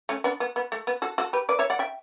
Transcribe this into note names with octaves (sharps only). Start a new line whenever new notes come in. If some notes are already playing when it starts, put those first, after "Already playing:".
A3 C#4
B3 D4
B3
B3
A3
B3
F#4 A4
F#4 A4
G4 B4
B4 D5
C#5 E5
D5 F#5
E5 G5